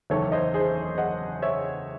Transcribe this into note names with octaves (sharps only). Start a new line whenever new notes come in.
F#1 E2 D#3 A4 C#5
C5 D#5
G#4 C5
D#5 F#5
C#5 E5